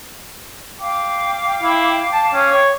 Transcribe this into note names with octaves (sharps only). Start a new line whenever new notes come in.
F5 G5 D6
E4
A5
C#4
C#5